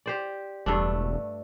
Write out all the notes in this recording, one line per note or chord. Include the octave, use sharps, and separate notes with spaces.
G4 C5 D5
E1 G2 A3 D4